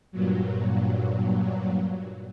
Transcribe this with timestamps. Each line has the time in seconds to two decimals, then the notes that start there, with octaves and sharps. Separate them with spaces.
0.12 G2 A#2 F#3